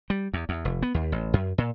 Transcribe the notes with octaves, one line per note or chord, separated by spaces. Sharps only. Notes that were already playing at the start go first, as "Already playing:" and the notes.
G3
E2
E2
F1
B3
D#2
A1
F#2
A#2